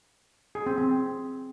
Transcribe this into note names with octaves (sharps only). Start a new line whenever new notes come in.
G#4
C4
C4